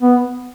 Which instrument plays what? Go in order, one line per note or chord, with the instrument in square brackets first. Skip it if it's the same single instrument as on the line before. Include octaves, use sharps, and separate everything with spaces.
[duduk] B3